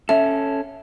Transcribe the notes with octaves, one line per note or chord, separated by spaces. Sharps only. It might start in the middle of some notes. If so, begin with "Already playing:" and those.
C#4 A4 E5